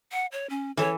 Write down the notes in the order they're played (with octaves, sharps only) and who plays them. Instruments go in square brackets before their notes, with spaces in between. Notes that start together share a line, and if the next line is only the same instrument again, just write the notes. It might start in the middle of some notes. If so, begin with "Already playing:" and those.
[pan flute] F#5
C#5
C#4
[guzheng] E3 A4 [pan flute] C#5